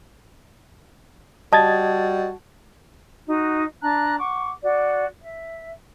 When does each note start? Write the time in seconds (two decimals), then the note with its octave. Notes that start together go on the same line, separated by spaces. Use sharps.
1.53 G3 F#4 D#5 A5 G#6 A6
3.27 D#4 F#4
3.81 D4 A5 A#5 F#6
4.19 F#5 C#6 D6
4.62 F#4 D5
5.21 E5